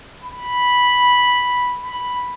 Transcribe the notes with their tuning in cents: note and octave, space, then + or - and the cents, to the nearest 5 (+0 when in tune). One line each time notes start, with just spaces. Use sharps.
B5 -5
B5 +0